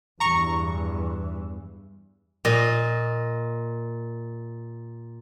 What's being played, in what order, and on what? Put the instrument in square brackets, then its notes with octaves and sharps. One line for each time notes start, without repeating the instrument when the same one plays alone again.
[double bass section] E2 G2 E3 [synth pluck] A#5 C#6
[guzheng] A#2 D#5